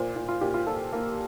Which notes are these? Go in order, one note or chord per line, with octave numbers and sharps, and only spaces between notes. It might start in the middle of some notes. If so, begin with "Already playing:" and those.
Already playing: A#2 C5
A#2
F4
A#2 G4
F4
A#2 A4
A#3